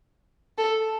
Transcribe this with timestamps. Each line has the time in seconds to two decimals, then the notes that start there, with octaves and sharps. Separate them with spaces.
0.58 A4